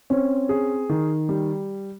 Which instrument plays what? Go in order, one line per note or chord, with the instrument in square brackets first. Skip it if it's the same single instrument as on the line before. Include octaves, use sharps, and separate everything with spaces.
[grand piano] C4 [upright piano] C#4
[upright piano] G#4
D#3
G3